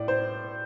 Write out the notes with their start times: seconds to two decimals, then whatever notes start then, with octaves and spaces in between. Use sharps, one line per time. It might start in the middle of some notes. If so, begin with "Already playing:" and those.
Already playing: A2 D5
0.08 C5